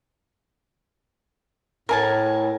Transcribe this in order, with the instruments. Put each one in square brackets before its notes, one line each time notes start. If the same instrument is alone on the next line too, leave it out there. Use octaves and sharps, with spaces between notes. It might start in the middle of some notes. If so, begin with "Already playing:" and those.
[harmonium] A2 [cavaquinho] A#4 G#5 A5